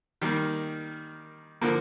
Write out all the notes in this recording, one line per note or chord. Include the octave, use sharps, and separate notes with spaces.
D#3 G3 A#3
D3 F3 A#3